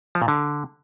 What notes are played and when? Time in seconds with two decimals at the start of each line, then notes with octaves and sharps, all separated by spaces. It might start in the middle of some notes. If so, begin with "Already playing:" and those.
0.15 F3
0.22 A#2
0.28 D3